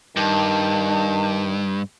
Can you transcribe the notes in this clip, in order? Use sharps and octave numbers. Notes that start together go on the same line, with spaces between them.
G2 D#3 A5